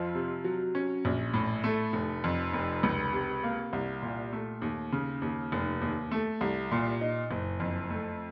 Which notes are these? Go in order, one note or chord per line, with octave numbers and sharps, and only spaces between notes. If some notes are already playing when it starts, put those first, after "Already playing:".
Already playing: F2 F3
C3
F#3
C#4
A#1
A2
A3
F1
F2
F1
C#2
C3
A#3
C2
A#2
A3
D#2
C#3
D#2
F1
D#2
A3
C2
A#2
D#4
F#1
F2
A3